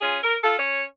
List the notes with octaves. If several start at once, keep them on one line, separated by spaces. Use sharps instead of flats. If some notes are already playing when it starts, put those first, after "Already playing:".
C#4 F4 G#4
A#4
F4 A4
C#4 C#5